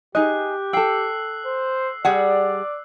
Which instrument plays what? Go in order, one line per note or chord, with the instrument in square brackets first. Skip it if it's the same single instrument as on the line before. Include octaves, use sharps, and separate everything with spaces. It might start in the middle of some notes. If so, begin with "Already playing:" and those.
[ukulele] D#4 G#4 D#5 [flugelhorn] G4 [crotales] F#6
[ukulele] A4 G5 [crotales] E6 C7
[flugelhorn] C5
[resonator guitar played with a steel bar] G3 G#4 F#5 [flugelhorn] D5